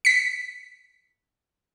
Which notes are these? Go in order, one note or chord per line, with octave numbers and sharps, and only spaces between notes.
B6 C#7